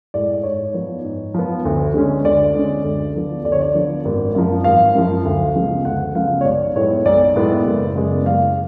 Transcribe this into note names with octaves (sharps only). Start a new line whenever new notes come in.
A2 G#3 D5
G#2 C#5
F3 B3
G#2
F3 B3
D2
D3 G#3 C#4
D2 D5
D3 G#3 C#4
D2
D3 F3 B3
D2 D5
C#5
D5
D3 F3 B3
G#1
F#2 F3
G#1 F5
F#2 F3
D2
C#3 F3 G#3 B3
D2 F#5
C#3 F3 G#3 B3 F5
C#5
B1 D5
A2 G#3 B3 C#5
B1 D5
A2 G#3 B3
F#1
F#2 C#3 G#3 B3
F#1 F5